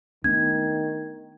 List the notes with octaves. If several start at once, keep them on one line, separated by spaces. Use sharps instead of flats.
D#3 A3 B3 D4 G#6